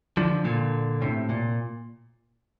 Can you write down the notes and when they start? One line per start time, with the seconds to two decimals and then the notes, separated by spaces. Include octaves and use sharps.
0.17 D3 F3
0.45 A#2 D3
1.02 A2 C3
1.29 A#2